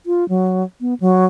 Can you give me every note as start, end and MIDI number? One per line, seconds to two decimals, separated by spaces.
0.06 0.27 65
0.29 0.63 54
0.81 0.94 59
1.00 1.26 54